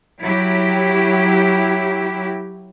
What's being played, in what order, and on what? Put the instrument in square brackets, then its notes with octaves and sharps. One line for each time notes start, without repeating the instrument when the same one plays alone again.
[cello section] F#3 E4 G4